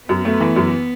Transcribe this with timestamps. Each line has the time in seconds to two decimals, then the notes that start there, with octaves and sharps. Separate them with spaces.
0.09 F#2 B3
0.25 A3
0.40 E3
0.56 F#2